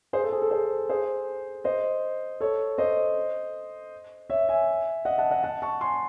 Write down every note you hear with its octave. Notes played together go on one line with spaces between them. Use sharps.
G#4 C5
A4
G#4
A4
G#4 C5
G#4 C5
C5 D#5
A4 C#5
C5 D#5
C#5 E5
E5 G#5
D#5 F#5
F#5 A5
D#5 F#5
F#5 A5
A5 C#6
G#5 C6